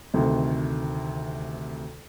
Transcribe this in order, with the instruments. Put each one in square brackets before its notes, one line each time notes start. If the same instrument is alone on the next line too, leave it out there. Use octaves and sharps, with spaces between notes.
[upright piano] D2 C3 D#3 A3